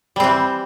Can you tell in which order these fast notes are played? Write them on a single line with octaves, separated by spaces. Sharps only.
G3 C4 E3